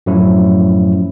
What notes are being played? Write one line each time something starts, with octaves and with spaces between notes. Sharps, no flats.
F#2 A2 F3 F#3 A3 E4